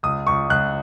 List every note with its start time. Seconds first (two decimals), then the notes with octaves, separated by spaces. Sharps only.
0.03 C#2 D#6
0.27 C#2 C#6
0.50 C#2 F#6